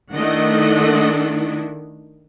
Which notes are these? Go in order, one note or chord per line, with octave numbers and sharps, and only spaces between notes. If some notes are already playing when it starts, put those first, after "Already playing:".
D#3 A3 D4 E4 D#5 F#5